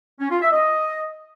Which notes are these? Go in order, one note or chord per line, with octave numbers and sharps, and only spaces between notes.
C#4
F4
E5
D#5